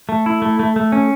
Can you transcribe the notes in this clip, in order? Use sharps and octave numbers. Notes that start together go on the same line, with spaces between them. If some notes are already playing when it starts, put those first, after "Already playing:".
A3
E4
A3
A3
A3
C#4